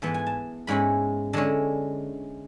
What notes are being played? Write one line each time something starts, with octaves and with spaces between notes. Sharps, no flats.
G#2 E3 B3 A5
G#5
A5
G#2 G#3 C#4 E4 B5
D3 G#3 C#4 E4 A5